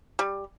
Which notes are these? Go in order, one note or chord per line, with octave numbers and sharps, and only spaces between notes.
G3